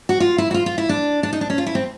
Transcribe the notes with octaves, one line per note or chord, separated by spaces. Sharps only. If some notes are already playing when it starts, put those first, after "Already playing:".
F#4
F4
E4
F#4
F4
F4
E4
D4
D4
D#4
D4
C#4
F4
E4
C4